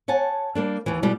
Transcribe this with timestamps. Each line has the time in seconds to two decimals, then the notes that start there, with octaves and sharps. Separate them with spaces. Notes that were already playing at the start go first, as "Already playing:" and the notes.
0.08 C#5 F#5 G#5 A5
0.55 G3 A#3 D4
0.86 D#2 E3
1.03 B2 G3 G#3